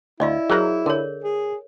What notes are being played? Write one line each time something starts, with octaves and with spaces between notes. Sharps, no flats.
D2 E4 D5 D#5 F5
F#3 G#4 A#4 C#5 A#5
D3 A#4 C#5
G#4